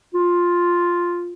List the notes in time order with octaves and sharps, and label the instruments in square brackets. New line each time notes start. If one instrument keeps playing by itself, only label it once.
[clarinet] F4